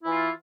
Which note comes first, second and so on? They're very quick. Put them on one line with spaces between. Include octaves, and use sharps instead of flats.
E4 E3 F4